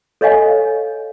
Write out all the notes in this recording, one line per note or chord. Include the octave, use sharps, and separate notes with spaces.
A4 C#5 D#5 F5 G#5